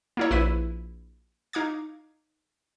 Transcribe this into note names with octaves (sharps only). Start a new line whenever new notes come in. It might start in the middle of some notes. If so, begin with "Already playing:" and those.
A#3 E4 C#5
A#1 E4 B4 B6 D#7
D#4 F5 D6 G#6